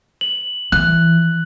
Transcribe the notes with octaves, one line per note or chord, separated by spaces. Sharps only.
F#7
E3 F#6